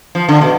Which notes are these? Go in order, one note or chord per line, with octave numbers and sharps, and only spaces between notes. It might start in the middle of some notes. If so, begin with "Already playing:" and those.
F3
D3
B2